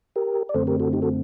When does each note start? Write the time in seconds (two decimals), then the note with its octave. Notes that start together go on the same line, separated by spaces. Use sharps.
0.16 G4 A#4
0.49 D5
0.54 F#2 D3 A3 C4 A4 C5
0.67 G4 A#4
0.80 F#4 A4
0.93 D#4 G4
1.02 F#4 A4